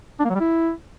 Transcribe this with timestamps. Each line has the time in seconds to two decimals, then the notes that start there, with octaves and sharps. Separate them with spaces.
0.19 D4
0.25 A#3
0.30 F#3
0.35 G3
0.40 E4